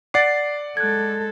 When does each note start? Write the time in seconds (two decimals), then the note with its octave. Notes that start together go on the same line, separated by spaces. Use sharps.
0.14 D5 F#5 D6 A6 C7
0.77 G#3 A4 F#6 G#6